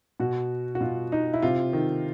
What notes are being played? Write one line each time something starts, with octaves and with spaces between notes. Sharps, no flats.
B2 F#4
F#4
B2 F4
D#4
E4
C3 F4
D#3